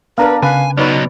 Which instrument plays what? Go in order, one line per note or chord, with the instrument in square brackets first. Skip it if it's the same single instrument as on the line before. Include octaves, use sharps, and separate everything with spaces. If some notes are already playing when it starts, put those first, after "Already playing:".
[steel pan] B3 D4 A#4 [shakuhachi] B4 [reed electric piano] F5 A#5
[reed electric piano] C#3 [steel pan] B4 [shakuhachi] F5 [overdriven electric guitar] G#5
[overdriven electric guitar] B1 B2 [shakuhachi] D#4 [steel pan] B4 C#5 D5